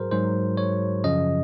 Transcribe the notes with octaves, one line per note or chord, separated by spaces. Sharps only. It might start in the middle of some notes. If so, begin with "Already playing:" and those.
Already playing: G#2 F#3 F#4 G#4 A#4 C5
G#2 F#3 C5
C#5
F#2 C#3 F3 D#5